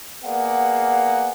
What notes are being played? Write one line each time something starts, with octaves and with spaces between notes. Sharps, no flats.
A#3 B3 G#4 D5 F5 F#5